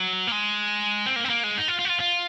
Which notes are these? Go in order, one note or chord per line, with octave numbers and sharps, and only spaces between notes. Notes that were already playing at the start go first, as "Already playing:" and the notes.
Already playing: F#3
A#3
G#3
C4
A#3
C4
A#3
G#3
D#4
F4
F4
F#4
F4
F4